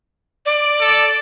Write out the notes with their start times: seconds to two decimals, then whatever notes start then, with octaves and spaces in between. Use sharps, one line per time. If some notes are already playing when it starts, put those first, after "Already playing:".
0.46 D5
0.81 A4